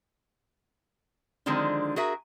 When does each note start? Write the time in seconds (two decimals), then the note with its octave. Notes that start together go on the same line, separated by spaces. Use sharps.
1.46 D3 D#3 F3 G#3 C4 D4
1.96 F#4 G#4 A#4 E5